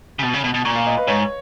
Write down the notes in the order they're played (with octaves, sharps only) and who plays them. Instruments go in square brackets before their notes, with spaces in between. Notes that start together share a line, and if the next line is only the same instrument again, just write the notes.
[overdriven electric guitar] C#3
B2
C#3
B2
B2
[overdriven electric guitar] A#2 [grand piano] C#6
[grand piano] F5
D#5
B4
[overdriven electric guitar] G#2 [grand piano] C#5